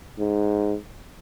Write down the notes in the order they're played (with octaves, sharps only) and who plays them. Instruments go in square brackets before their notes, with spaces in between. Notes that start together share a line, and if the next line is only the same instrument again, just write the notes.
[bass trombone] G#2